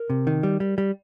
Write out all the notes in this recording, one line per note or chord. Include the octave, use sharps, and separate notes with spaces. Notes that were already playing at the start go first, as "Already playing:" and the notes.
Already playing: A#4
C3
D#3
G3
G3
G3